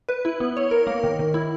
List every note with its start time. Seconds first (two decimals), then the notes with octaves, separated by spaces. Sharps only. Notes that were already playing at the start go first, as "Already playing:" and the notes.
0.09 B4
0.25 E4
0.40 B3
0.57 C#5
0.71 A#4
0.87 A#3
1.04 D#3
1.19 D#3
1.34 E4